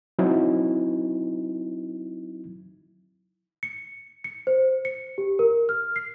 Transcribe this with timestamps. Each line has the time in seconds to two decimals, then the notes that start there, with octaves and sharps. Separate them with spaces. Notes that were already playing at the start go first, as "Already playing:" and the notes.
0.19 F#3 C4 D#4 E4
3.63 C#7
4.24 C#7
4.47 C5
4.85 C#7
5.18 G4
5.39 A#4
5.69 F6
5.96 C7